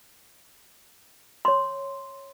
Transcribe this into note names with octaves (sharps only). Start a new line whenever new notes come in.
C#5 C6